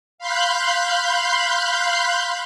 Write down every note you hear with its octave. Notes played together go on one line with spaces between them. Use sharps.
F5 B5 C6 F#6 G6